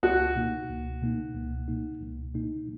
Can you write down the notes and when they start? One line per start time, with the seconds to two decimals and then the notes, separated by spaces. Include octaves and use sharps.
0.03 C#2 F#4
0.36 B2 A#3 D#4
0.69 C#2
1.02 B2 A#3 D#4
1.35 C#2
1.68 B2 A#3 D#4
2.01 C#2
2.34 B2 A#3 D#4